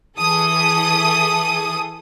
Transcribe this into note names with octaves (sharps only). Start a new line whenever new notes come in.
E3 G#4 A4 D#6